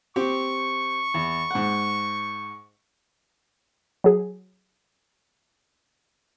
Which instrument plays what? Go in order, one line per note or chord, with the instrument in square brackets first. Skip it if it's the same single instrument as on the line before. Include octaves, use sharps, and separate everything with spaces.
[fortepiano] C4 G4 [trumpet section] C#6
[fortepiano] E2
G#2 F#5
[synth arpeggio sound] F#3 G#4